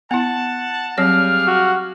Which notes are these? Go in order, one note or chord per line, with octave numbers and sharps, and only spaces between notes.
B3 E4 F#5 A5
F#3 G3 C4 G#4 C#5 F5 F6
F#4